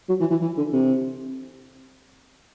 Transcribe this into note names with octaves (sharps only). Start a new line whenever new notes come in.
F#3
E3
E3
E3
D3
C3